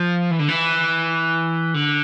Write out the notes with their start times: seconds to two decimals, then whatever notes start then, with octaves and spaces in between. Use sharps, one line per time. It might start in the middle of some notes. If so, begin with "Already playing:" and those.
Already playing: F3
0.31 E3
0.39 D3
0.48 E3
1.74 D3